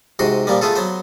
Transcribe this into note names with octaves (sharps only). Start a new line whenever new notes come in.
G#2 C3 F#4 C6
A#2 F3 G3 A#3
A3 B3 F4 G#4 A4
F#3 B3 C5